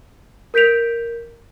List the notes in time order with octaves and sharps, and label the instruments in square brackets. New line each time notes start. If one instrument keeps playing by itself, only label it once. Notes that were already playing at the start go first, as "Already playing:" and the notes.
[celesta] A#4 G6 B6 D7 F7